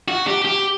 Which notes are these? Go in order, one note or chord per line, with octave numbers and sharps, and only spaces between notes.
F#4
G4
G4